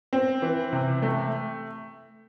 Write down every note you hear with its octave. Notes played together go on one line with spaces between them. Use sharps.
C4
E3
C3
A3